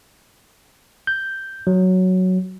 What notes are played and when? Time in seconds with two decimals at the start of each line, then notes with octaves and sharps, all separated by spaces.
1.07 G6
1.67 F#3